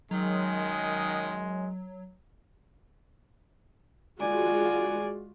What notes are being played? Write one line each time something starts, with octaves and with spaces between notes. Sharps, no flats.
F#2 D#3 F#3 G#3
G#3 F4 F#4 D5 G#5